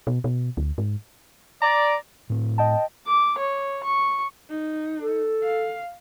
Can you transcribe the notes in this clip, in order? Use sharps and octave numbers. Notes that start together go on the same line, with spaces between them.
B2
B2
D2
G#2
D5 A#5
A2 C4
D#5 G5 A5
D6
C#5
C#6
D#4
A4
F5